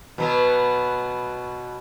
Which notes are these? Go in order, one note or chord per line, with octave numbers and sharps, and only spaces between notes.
B2 F#3 B3